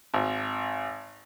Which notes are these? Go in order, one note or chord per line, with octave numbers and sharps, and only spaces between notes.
G#1